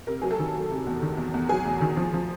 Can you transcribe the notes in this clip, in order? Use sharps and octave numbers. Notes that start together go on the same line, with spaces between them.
C3 A#4
F#3 G#4
A4
D#3
F#3
C3
E2
D#3
E2
E2
F#3 G#4
E2
D#3
F3
F3